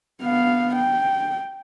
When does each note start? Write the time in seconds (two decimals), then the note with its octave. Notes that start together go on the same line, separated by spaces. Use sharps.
0.22 B3 F5
0.76 G5